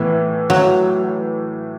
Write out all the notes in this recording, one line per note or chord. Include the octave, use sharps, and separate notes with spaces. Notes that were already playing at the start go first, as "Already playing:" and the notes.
Already playing: A2 E3 B3 E4
F#3